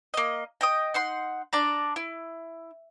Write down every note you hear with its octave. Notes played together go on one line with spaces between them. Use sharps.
A#3 D#5
D#5 G5 D#6
D#4 F#5 C6
D4 D5 A#5
E4